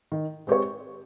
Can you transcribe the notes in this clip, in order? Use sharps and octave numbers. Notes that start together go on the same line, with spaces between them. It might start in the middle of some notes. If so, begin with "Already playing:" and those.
D#3
G#3 C4 G4 C#5